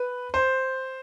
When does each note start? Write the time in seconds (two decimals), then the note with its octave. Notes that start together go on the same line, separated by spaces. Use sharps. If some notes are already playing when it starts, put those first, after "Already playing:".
Already playing: B4
0.34 C5